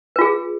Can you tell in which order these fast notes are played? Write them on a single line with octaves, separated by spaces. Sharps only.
B4 F4 G#4